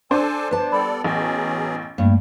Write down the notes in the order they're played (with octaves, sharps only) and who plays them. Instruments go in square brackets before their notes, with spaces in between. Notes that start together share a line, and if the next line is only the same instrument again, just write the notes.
[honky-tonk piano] D4 C5 [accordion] A4 G#5 A5
[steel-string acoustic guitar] B3 A5 [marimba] B4
[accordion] G3 A4 D5 [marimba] B5
[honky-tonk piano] A1 [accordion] F#3 C#4 G#4
[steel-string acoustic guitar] G2 [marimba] A3 A#3